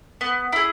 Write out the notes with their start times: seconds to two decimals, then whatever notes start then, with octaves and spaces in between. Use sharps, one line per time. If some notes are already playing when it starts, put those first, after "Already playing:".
0.21 B3
0.53 E4 G#4